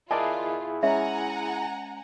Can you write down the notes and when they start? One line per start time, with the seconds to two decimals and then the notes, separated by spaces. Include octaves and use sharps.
0.11 E4 F4 G#4 A#4 D5 D#5 A5
0.83 G#3 C#4 E5 F#5 G#5 A#5